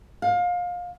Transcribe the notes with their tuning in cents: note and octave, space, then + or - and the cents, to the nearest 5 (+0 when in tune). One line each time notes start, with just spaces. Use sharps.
F5 +25